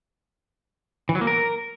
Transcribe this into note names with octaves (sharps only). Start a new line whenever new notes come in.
E3
F#3
A#3
A#4